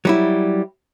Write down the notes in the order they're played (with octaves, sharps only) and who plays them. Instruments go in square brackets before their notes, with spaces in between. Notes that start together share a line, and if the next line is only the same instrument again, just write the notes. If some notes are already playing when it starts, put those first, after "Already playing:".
[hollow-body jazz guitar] F#3 G3 E4